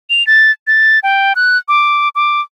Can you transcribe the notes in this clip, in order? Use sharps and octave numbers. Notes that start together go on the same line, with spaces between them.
F7
A6
A6
G5
F#6
D6
D6